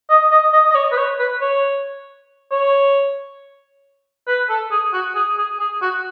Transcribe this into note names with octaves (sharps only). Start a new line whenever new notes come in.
D#5
D#5
D#5
D#5
C#5
B4
C#5
B4
C#5
C#5
B4
A4
G#4
F#4
G#4
G#4
G#4
F#4